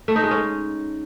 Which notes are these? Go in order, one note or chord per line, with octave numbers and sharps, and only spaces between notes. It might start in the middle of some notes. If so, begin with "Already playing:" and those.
A3
D#4
G#3
C#4